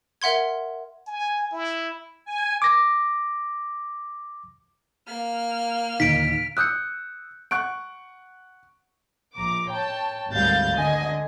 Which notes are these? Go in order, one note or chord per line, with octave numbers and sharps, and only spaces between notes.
A#4 E5 F#5 C6 G#6
G#5
E4
G#5
D6 A#6
A#3 F6
D#2 A#2 D3 D#4 B6 D7
D#6 E6 F#6 G6 C#7
F#5 C#6 F#6 D7
A#1 A#5 D6
C#5 G5 A5
G#1 D2 G3 F5 G6 A6
D3 D#5 G#5